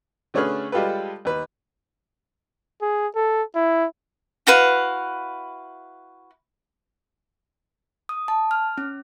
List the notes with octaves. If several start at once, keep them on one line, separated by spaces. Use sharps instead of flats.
D3 A3 C#4 G#4 B4 F6
G3 G#3 F4 G4 A4 B4
D#2 B4
G#4
A4
E4
E4 F#4 B4 F5
D#6
A5
F6
C#4